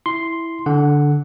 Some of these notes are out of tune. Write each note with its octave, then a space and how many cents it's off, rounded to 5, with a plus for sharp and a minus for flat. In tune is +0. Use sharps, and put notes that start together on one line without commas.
E4 +0 C6 +0
D3 -10 F#5 +0